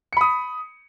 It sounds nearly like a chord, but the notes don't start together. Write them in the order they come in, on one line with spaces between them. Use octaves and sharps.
C#7 B5 D#6